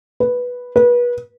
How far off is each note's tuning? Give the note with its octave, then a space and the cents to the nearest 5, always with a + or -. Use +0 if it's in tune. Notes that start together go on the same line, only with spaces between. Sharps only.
B4 -5
B4 -30